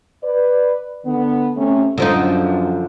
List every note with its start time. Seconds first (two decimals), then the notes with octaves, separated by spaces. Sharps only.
0.24 B4 D5
1.05 D3 B3
1.57 C3 A3 C#4
1.98 F#2 D3 F3 D#4